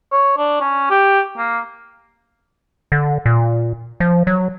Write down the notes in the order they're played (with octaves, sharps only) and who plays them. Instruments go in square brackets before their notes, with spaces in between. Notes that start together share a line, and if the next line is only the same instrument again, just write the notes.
[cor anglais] C#5
D4
C#4
G4
A#3
[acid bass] D3
A#2
F3
F#3